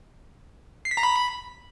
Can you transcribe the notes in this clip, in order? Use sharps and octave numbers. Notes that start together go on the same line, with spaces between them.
C7
B6
A#5
B5